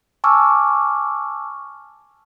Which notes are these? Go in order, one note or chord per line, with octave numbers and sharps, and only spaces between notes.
G#5 A5 C#6 D6 E6 F6